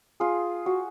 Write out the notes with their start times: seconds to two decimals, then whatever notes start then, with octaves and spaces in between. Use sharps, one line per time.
0.20 F4 G#4
0.66 F#4